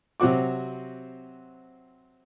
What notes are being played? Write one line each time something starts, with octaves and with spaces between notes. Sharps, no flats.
C3 F#3 C4 F#4 D6